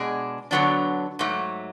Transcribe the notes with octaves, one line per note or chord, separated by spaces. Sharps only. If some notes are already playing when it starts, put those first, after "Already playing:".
Already playing: B2 G#3 D4 G#4
D3 F#3 B3 D4
G#2 F#3 A3